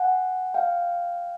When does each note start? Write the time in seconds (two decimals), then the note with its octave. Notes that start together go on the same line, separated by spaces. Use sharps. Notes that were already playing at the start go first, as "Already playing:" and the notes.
Already playing: F#5 G#5
0.54 F5 G5